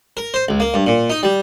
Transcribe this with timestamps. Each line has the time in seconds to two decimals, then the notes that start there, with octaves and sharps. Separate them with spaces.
0.17 A#4
0.34 C5
0.49 C#2
0.60 A#3
0.74 G2
0.87 A#2
1.10 D#4
1.23 G3